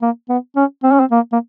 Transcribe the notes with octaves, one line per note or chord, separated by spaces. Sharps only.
A#3
B3
C#4
C4
C#4
C4
A#3
A#3